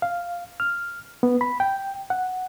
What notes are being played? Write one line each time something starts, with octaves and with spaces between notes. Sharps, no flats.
F5
F6
B3
B5
G5
F#5